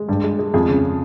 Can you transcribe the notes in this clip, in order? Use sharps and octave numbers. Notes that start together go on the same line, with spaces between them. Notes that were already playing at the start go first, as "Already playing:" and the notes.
Already playing: G#3
G2
G#3
G#3
F2 G#4
C#3